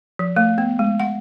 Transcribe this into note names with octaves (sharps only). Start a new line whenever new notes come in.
F3
A3
B3
G#3
F#5